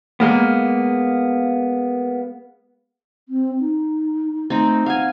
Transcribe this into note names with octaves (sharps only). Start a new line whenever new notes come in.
G#3 A#3 B3
C4
D#4
A3 C4 D#4
F5 F#5 G#5